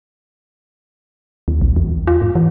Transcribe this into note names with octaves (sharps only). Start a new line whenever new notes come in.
D#2
A#1
E2
F4
G#2
E3